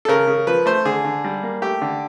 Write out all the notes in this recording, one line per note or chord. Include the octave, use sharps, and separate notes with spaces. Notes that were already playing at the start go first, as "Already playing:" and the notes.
A4
C#3 A#4
C#3
F3 B4
A3 C5
D3 G#4
D3
G3
A#3
A3 G4
D3